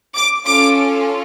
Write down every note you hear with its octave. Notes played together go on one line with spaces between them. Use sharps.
D6
C#4 F4 A4 D6